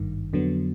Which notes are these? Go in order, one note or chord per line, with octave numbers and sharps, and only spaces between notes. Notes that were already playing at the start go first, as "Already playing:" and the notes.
Already playing: G#1 G2 D#3
F2 D3 F#3 B3